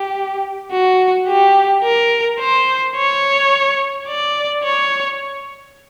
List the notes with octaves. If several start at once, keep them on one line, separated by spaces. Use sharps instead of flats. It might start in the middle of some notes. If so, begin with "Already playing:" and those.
Already playing: G4
F#4
G4
A#4
C5
C#5
D5
C#5